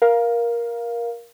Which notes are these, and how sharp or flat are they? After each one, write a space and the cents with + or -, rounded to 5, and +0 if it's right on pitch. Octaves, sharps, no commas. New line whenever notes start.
A#4 +15 F5 +0